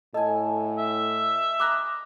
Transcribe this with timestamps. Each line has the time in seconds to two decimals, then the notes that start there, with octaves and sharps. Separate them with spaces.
0.14 A2 A4 D#5 G#5
0.78 E5
1.60 D#5 A#5 B5 D6 F#6